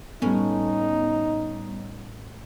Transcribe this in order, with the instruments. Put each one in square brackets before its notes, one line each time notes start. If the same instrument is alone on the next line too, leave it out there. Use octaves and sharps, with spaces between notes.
[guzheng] A2 C#4 [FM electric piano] G3 B3 [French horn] D#4